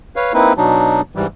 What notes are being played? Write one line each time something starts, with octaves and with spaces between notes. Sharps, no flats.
B4 C#5 F5
A#3 C4 D#4 E4 B4
B2 F#3 D4 D#4
G#2 E3 G3